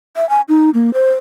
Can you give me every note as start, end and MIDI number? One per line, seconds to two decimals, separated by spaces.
0.16 0.28 76
0.29 0.41 80
0.49 0.70 63
0.74 0.93 58
0.94 1.12 72